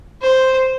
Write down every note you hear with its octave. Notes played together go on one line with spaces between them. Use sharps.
C5